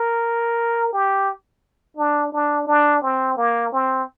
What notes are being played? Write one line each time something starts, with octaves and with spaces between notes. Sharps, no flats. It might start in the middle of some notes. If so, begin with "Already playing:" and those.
Already playing: A#4
G4
D4
D4
D4
C4
A#3
C4